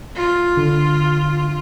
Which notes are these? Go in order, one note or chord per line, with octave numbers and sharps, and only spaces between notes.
F4
D3